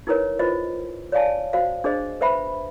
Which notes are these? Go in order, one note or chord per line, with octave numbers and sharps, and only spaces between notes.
D#4 E4 A#4 B4 C#5
F4 B4 C5 D#5
C#5 D5 F5 G#5 A5
F#4 C5 F5
D4 G#4 C5 D#5
B4 C5 E5 G5 B5